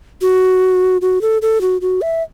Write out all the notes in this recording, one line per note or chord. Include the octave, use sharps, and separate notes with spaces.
F#4
F#4
A4
A4
F#4
F#4
E5